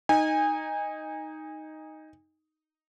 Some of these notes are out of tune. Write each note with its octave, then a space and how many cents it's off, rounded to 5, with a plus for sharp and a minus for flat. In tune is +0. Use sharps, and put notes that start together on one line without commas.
D#4 +0 G#5 -30